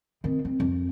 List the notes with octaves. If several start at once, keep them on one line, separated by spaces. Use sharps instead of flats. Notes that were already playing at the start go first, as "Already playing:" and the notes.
D#3 C4
C4
F2